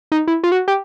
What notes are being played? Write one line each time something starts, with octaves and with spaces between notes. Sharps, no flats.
D#4
E4
F4
F#4
G4